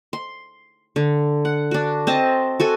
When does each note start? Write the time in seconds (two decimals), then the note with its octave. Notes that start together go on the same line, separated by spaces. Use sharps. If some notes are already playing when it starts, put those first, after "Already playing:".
0.13 C6
0.96 D3
1.45 F#5
1.71 D4 F#4
2.07 C4 D#5 A5
2.60 F#4 A4 G#5